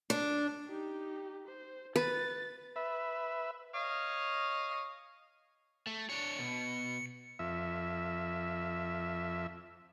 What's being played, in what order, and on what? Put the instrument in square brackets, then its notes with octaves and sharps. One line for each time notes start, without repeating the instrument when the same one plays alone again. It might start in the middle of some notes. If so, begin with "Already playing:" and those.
[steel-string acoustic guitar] D4
[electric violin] D#4 G4
C5
[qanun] B4 [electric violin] A6
[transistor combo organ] B4 E5
[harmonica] C#5 D#5 F5
[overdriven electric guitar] A3
[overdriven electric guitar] D4 C#5 [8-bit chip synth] C#7
[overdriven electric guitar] B2
[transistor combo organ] F2 E5